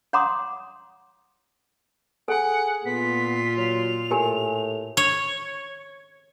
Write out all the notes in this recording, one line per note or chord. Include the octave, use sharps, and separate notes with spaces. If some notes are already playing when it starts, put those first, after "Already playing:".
C#5 F#5 A#5 C6 D6 D#6
G#4 A4 F#5 G#5
A#2 B3 F4 B6
F#3 F7
A2 G4 A#4 G#5
C#5